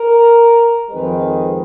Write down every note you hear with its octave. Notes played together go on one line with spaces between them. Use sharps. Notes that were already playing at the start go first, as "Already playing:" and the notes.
Already playing: A#4
F2 D#3 G#3 B4